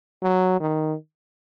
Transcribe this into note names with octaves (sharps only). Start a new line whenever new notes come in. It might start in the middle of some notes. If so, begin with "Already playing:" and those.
F#3
D#3